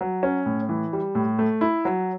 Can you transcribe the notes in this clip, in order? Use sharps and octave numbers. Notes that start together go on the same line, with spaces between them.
F#3
C#4
A2
E3
G3
A2
A3
E4
F#3